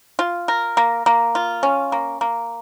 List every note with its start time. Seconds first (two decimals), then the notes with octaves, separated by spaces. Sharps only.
0.19 F4
0.48 A#4
0.77 A#3
1.06 A#3
1.35 F4
1.63 C#4
1.92 A#3
2.21 A#3